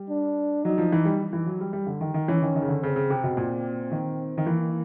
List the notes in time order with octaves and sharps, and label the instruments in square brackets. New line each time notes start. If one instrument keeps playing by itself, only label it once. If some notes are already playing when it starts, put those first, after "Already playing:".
Already playing: [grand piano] G3
[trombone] D4
[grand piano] F#3 [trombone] D#4
[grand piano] F3
E3
G3
E3
F#3
G3
G3
D3
D#3
D#3
[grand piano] E3 [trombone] C#4
[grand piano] D#3
D#3
C#3
D3
[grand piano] C#3 [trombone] C4
[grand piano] C#3
C3
B2
A#2
D#3
D#3
[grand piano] E3 [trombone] A#3